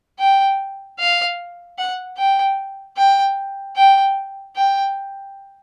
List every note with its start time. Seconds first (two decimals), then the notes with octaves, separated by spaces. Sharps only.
0.19 G5
0.99 F5
1.78 F#5
2.17 G5
2.97 G5
3.76 G5
4.56 G5